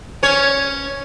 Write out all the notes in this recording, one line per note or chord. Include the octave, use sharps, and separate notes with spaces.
C#4 C#5